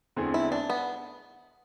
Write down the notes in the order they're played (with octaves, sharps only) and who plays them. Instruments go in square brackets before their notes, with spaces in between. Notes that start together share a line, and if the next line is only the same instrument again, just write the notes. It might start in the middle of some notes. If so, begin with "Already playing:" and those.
[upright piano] E2 D3 A3 C4 G#4
[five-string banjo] E4
D4
B3